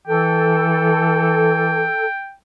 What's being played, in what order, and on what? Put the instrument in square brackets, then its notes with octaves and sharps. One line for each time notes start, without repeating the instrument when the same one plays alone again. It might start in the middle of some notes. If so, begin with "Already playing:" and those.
[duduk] E3 [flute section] A4 [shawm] G5